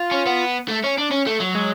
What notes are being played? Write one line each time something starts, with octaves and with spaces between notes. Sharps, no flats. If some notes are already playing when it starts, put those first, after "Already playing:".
Already playing: F4
C#4
B3
A3
C#4
D4
C#4
A3
F#3
G#3